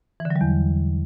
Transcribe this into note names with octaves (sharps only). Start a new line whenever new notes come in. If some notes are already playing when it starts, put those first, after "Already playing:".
E3
D3
F#3
G3
E2